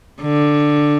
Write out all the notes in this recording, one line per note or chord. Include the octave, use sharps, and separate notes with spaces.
D3